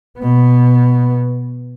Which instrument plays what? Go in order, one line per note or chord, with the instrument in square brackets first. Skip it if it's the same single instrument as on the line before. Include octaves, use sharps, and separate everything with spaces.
[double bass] B2 B3